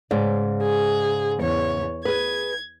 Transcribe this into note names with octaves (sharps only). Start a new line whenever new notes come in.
G#2 C#3 D5
G#4
E2 C#5
G#4 B4 G#6